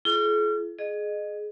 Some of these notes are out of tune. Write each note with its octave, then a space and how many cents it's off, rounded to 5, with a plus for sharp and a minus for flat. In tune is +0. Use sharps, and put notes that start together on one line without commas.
F4 -40 G#4 +40
G#4 +20 D#5 -25